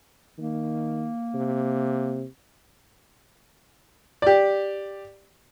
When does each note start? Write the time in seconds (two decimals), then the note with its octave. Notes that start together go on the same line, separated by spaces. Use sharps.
0.38 D#3 A#3
1.34 C3
4.22 G4 D5